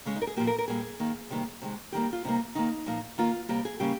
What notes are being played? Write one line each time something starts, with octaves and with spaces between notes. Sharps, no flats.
C#3 G#3 C#4
D#4
A#4
G#4
A#2 F3 A#3 G4
A#4
A#4
A#2 G3 A#3 G#4
D#3 A#3
C3 D#3 G3 A#3
C3 D#3 G#3
D#3 G3 A#3 G4
F4
C3 G3 A#3 D#4
D#3 A#3 D#4
A#2 F3 A#3
D#3 A#3 F4
C3 G3 A#3 G4
G#4
C#3 G3 A#3 G4